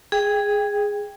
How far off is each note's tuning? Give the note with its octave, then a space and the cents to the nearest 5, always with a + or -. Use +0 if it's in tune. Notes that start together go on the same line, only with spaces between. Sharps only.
G#4 +0 G5 +20